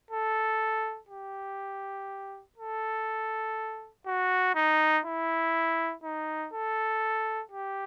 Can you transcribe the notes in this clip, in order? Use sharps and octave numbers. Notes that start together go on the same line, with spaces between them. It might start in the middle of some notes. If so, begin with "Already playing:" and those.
A4
G4
A4
F#4
D#4
E4
D#4
A4
G4